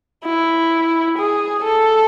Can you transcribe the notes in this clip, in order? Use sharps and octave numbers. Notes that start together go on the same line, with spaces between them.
E4
G#4
A4